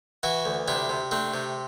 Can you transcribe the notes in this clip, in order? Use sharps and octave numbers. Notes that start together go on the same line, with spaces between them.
E3 E4 F#4
D2
C3 D4 E4
C3
A3 C4 D4
C3